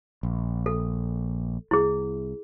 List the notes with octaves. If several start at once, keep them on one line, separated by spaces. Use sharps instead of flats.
A#1
A4
C2 E4 G#4